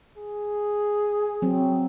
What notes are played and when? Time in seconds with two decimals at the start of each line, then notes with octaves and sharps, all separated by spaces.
0.17 G#4
1.42 F#3 C4